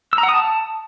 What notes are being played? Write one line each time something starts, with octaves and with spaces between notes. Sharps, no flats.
E6
A#5
F#5
D#6
A5